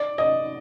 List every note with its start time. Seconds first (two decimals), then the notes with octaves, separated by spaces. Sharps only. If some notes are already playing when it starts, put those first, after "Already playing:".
Already playing: D5
0.18 D#5